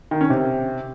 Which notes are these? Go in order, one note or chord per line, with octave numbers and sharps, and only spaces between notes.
D#3
C#4
C3